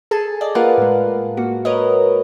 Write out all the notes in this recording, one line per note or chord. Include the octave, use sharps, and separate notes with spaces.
G#4 A4 G#5 A5
D5 D#5
A#3 F4 A#4 B4 F5 F#5
A2 G#3
A#3 F#4
A#4 B4 C#5 D#5